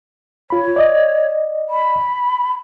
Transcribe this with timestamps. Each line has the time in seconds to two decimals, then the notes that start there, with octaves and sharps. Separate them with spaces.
0.50 F4 C#5 B5
0.76 D5 D#5
1.69 B5